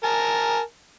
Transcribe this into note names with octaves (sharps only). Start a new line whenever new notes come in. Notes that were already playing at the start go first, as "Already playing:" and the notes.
A#4 G#5 A5